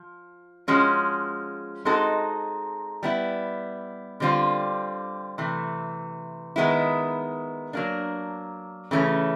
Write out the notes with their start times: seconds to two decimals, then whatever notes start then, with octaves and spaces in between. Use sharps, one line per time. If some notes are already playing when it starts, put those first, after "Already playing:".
Already playing: F3
0.68 F3 G#3 C#4 F#4
1.85 G#3 C4 D#4 F#4 A4
3.03 G3 B3 E4
4.20 D3 G3 C4 F4
5.38 C3 E3 A3
6.56 D#3 G#3 B3 E4
7.73 F#3 A#3 D4
8.91 C#3 E3 A3 C#4